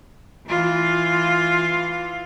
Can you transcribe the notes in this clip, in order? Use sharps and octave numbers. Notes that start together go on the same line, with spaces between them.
E3 F4